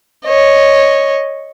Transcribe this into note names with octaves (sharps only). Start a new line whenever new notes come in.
C#5 D#5